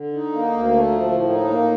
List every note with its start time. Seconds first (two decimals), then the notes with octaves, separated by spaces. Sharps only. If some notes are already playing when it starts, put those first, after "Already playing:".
Already playing: D3
0.13 D#4
0.32 A#3
0.52 D2
0.71 A3
0.91 F3
1.10 A2
1.30 D#4
1.50 A#3